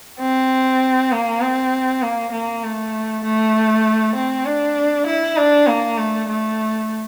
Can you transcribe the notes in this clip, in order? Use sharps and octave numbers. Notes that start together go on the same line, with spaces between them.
C4
A#3
C4
A#3
A#3
A3
A3
C4
D4
E4
D4
A#3
A3
A3